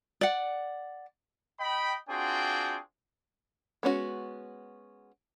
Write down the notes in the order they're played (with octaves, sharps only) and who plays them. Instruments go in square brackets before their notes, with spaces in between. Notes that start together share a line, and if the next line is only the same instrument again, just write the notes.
[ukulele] D5 F#5
[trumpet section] D#5 G5 B5
C4 D4 F4 F#4 G#4 G5
[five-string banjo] G#3 B3 C#4 D4 F#4